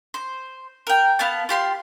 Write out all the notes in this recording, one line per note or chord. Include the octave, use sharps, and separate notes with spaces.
C5
A#4 G5
B3 F5 A5
F4 G4 C6